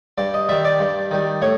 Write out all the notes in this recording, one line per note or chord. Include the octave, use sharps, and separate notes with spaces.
G2 D5
D#5
D#3 G3 E5
D5
G2
D#3 G3
A2 C#5